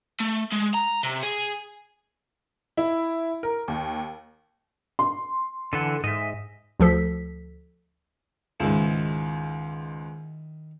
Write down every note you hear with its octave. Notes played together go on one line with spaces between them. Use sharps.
A3
G#3
A#5
C3
G#4
E4
A#4
D#2
C6
D3 E3 A4 F#5
G#2 D#5 E5
D2 F3 A4 B6
C#2 G#2 D#3 E4